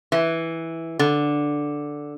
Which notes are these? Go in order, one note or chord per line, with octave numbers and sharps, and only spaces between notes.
E3
D3